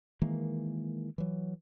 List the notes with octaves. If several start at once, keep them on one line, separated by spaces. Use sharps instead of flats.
D#3 E3 G#3 A#3
E3 F#3